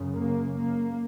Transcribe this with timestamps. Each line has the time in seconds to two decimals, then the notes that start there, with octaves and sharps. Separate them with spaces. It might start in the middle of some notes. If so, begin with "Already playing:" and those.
Already playing: F#2 C#3
0.16 A#3
0.58 A#3